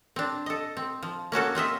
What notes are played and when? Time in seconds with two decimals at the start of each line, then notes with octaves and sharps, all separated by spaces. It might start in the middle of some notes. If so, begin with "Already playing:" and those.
0.16 C4 D4
0.46 A4 D#5
0.77 C4
1.03 F3
1.32 A#3 C#4 F#4 A4
1.55 C4 F4 D#5 E5